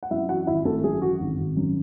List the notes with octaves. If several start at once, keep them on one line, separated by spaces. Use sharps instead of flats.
F#5
F#2 E4 E5
E3 F#4 F#5
G#1 E4 E5
G#1 A3 A4
F#2 G#4
E3 F#4
G#1
G#1
F#2